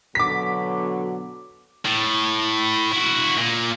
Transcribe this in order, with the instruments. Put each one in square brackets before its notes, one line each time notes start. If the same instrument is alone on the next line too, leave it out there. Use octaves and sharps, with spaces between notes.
[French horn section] B2 D3 F#3 [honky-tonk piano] D6 B6
[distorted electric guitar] A2
E4 F#4
A#2